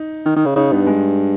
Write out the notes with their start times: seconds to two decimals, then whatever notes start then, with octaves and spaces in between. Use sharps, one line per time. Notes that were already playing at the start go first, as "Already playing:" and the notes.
Already playing: D#4
0.26 D#3
0.36 D#3
0.46 C#3
0.56 C#3 D#4
0.72 G2 B3
0.87 G#3